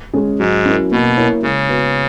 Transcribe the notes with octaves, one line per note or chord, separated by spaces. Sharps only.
G#3 C#4 G#4
G#2 F#3
C#4 E4 A#4
B2 A#3
E4 A#4 C#5
C#3 G#3
B3 F#4 B4